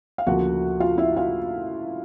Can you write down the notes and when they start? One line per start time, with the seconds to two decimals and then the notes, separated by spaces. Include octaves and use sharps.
0.18 F5
0.27 D2 C#3 F3 A#3 F#4 F#5
0.80 F4 F5
0.98 E4 E5
1.17 F4 F5